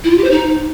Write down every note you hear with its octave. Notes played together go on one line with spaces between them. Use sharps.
E4
F4
G4
C5
D#4